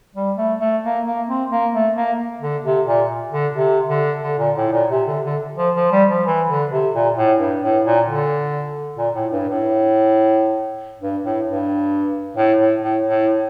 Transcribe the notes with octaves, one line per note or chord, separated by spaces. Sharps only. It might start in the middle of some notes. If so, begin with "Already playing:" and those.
G3
A3
A3
A#3
A#3
C4
A#3
A3
A#3
D3
C3
A#2
D3
C3
D3
D3
A#2
A2
A#2
C3
D3
D3
F3
F3
G3
F3
E3
D3
C3
A#2
A2
G2
A2
A#2
D3
A#2
A2
G2
A2
G2
A2
G2
A2
A2
A2
A2